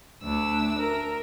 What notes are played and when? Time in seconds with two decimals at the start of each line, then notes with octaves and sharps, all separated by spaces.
0.23 D2 D4 E6
0.78 A#4